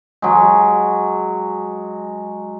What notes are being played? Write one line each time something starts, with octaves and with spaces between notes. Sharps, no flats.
F#3 G#3